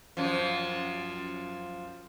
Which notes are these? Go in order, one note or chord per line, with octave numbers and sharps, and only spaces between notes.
F#2 F3